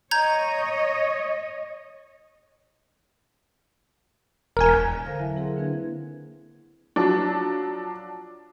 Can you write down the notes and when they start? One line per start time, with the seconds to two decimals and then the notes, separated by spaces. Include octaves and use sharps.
0.11 C#5 D#5 A#5 G6 G#6
4.57 E1 A#4 G#5
5.04 D3 A4 C5 F5 A#6
5.19 D3 F#3 E4 E5 G#5 A5
5.36 C4 E4 G#4 A#4 F#5 C6
5.56 D3 A#3 D4 B4 G#6
6.96 F3 F#3 D4